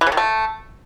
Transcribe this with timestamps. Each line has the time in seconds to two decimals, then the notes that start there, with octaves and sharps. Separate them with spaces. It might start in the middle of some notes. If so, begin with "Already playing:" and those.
0.01 E3
0.07 C#3
0.12 D#3
0.17 A3